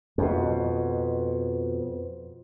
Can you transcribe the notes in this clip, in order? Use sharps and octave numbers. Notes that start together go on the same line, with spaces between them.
F2 B2